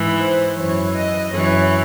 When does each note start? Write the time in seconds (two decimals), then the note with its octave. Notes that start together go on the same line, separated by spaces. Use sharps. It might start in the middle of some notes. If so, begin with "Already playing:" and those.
Already playing: G#2 E3
0.19 C5
0.56 F#2 E3 C#5
0.94 D#5
1.33 F#2 E3 C#5